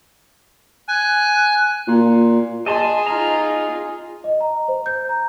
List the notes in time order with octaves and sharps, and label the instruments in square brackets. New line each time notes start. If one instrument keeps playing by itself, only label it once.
[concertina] G#5 [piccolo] F#6
[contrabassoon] A#2
[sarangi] G#4 [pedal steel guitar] D#5 A5 C6
[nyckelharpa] D#4 F4 [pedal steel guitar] A#5
[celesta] D#5
A#5
C5
G6
A#5